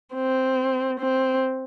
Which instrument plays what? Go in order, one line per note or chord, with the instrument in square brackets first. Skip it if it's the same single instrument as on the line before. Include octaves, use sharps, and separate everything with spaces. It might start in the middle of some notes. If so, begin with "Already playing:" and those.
[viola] C4
C4